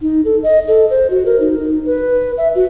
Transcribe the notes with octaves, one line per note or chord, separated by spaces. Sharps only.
D#4
A4
D#5
A4
C5
F#4
A#4
D#4
D#4
B4
E5
F#4